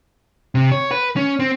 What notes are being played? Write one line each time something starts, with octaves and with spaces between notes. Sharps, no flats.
C3
C#5
B4
C#4
C4